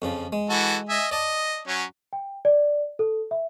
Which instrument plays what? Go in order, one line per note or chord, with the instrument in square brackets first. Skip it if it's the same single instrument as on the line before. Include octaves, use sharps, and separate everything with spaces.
[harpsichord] F2 C#3 F3
G#3
[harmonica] E3 F#4 A4
D#5 E5 G#5
[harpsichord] D5 A5 [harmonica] D#5
[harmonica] F#3 C#4
[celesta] G5
D5
A4
E5